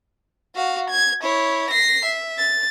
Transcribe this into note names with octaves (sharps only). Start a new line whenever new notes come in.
F#4 F5
G#6
E4 C#5
A#6 C7
E5
A6